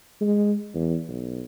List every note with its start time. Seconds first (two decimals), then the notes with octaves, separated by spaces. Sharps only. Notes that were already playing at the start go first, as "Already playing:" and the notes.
0.21 G#3
0.74 E2
1.08 B1